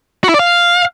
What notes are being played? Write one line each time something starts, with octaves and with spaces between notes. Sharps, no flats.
F#4
E4
D5
F5